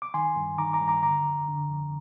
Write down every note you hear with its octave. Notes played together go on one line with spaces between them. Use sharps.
D6
D#3 G#5 C6
G2
D#3 A#5 D6
A#5 D6
G2
A#5 D6
D3 A#5 D6
F2
D3
F2